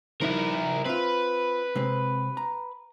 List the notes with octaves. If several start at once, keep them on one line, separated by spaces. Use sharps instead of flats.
F3 D#4 E4 A#4 B4
C4 F4 B4
C3 G#3 C4
A#5